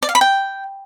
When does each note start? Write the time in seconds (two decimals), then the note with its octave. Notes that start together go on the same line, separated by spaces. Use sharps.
0.03 D5
0.09 F5
0.15 B5
0.21 G5